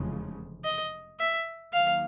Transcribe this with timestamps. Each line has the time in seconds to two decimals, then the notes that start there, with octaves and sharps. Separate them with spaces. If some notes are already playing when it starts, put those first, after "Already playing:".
Already playing: F1 E2 C#3 F3 G#3
0.64 D#5
1.19 E5
1.73 D#2 D#3 F#3 A#3 F5